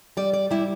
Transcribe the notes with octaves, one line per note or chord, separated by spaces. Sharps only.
G3 D5
D5
G3 E4